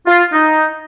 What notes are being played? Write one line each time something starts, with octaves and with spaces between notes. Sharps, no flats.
F4
D#4